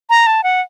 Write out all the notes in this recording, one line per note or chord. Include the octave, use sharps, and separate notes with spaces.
A#5
A5
F#5